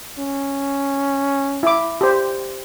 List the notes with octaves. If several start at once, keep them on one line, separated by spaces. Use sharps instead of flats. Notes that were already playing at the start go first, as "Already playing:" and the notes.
C#4
E4 D6
G4 C5